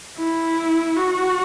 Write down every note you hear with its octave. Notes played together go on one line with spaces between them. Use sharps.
E4
F#4